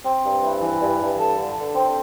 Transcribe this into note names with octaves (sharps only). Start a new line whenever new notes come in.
C4
G2
E3
E3
G2
G2
A4
D3
D3
C4